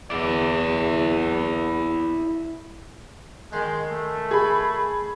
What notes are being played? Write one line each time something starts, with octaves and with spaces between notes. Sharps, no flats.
E2 E4 D5
D#3 G#3 G5 C6
A3
G#4 B5